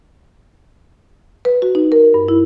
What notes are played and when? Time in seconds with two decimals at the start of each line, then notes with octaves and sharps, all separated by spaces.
1.45 B4
1.62 F#4
1.75 D#4
1.92 A#4
2.14 G2
2.28 E4